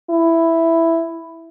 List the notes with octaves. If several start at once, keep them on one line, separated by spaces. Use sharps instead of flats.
E4